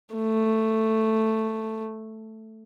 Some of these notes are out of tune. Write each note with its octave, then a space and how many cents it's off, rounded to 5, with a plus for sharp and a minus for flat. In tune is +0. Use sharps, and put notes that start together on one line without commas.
A3 +5